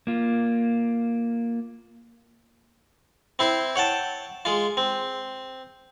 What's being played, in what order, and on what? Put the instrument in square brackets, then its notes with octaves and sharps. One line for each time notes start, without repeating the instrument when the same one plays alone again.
[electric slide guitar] A#3 F4
[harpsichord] C4 E4 C5
C#5 F#5 G5 A5
G#3 F4
C4